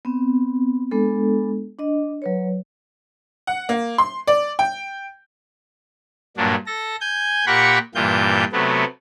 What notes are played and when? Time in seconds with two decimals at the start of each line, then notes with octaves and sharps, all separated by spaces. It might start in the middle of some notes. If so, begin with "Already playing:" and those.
0.05 B3 C4
0.91 G#3 B3 D4 A4
1.79 D4 D#5
2.22 F#3 B4 C#5
3.47 F#5
3.69 A#3
3.98 C6
4.27 D5
4.59 G5
6.37 G2 A#2 F#3 D4
6.66 A4 A#6
7.01 G#5 G6
7.46 A#2 G4 A#4 F#5 B5 C#6
7.95 G2 A#2 E3 G3 F4 G6
8.52 C3 F#3 A3 B3